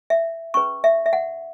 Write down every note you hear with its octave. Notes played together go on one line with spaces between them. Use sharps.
E5
C#4 G#4 B4 C#6
E5
E5
F#5